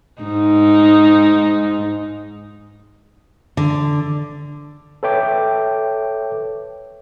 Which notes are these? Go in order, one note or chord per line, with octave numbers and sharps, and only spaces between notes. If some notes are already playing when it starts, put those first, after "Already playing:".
G#2 D#4
D3
A4 B4 C#5 E5 G5 D6